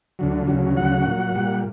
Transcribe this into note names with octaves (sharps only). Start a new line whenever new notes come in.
D2 D3 F#3
D2 C#3 F#3
D2 C#3 F#3 F#5
A#2 F#3
A#2 G3